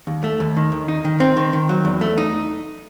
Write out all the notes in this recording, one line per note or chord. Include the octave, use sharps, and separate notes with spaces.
D#2
A3
D#2
D#3
D#2
D#4
D#3
C4
D#3
D#3
F#3
E2
A3
D#4